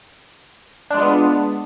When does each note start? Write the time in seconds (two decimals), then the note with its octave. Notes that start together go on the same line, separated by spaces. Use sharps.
0.91 D4
0.94 G#3
0.98 F4
1.02 B3